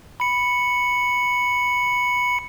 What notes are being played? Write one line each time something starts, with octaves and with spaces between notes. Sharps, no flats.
B5 C#7